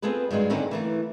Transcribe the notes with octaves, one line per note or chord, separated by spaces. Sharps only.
B3 C4 F4 G#4 A4 B4
G2 D#3 F#3 G#3 F4
D3 D#3 A#3 C4 C#4 E4
E3 A3 A#3